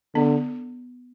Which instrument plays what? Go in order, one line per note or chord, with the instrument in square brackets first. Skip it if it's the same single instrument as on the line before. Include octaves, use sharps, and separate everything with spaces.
[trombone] D3 [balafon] B3